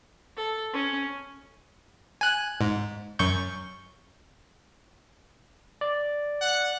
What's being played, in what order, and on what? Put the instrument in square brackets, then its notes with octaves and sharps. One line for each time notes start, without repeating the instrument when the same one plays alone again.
[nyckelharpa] A4
C#4
[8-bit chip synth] G#5 F#6
G#2
F#2 C#6 G6
[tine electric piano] D5
[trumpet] F#5